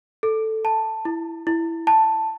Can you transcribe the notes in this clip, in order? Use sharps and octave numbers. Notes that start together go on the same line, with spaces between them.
A4
A5
E4
E4
A5